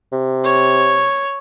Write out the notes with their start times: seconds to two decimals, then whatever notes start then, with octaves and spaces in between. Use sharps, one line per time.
0.12 C3
0.45 C#5